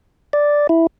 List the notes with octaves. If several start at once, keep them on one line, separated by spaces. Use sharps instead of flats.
D5
E4